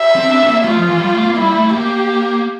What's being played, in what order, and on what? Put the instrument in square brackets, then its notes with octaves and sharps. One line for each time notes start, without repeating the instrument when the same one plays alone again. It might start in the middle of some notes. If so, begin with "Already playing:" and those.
Already playing: [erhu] E5
[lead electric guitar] C4
D4
C4
A#3
[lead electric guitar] A3 [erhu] F4
[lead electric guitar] F3
E3
G3
A3
A#3
[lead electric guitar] G3 [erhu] E4
[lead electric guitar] A3
[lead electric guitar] A#3 [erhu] G4